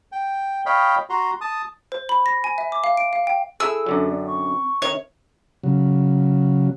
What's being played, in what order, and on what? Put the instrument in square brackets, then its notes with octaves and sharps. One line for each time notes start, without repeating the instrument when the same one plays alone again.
[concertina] G5
C#5 D#5 F5 G5 B5
F#4 A#5 C6
A5 D#6
[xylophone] C5
B5
A#6
G#5
E5
D6
F5
D7
F5
G5
[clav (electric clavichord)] E4 G#4 [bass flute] A4 [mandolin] E6
[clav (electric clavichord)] F#2 D3 F#3
[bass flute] C4 [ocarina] D5
[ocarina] C#6
[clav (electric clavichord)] D#3 [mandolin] C#5 [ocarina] E5
[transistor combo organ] C#3 F#3